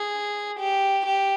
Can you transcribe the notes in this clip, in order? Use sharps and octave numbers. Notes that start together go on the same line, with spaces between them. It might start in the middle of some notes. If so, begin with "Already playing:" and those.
Already playing: G#4
G4
G4